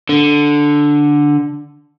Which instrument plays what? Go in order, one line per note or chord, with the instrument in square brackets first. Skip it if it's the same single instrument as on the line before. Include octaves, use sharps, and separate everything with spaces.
[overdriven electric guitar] D3